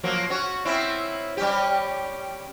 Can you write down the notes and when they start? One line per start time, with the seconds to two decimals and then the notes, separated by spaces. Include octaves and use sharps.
0.04 F3 F#3 A#3
0.29 C#4 F#4 C#5
0.65 C4 C#4 E4
1.37 G3 C#4 G4